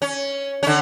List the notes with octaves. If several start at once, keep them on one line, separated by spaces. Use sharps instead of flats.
C#4
D3 C#4